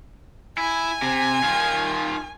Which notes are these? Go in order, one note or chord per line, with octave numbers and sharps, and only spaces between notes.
E4 G#5
C3
D#3 F4